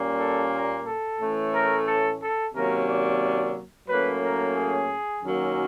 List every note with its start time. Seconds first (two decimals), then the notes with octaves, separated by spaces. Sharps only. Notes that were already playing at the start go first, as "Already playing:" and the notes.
Already playing: A#2 G3 A#3 C#4
0.17 A4
0.52 A#4
0.85 A4
1.19 A2 E3 A3 C#4
1.52 A#4
1.86 A4
2.20 A4
2.53 C3 D#3 F#3 A#3 C#4 A#4
2.87 D5
3.89 A2 F#3 A#3 C#4 B4
4.22 A#4
4.56 G#4
5.22 F#2 D#3 F#3 A#3 C#4